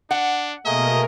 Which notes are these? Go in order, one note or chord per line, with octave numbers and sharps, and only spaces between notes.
D4 F#5
B2 A3 A#3 G#4 A#4 D#5